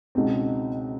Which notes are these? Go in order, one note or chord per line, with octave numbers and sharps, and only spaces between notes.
C#2 B2 G#3 C4 D#4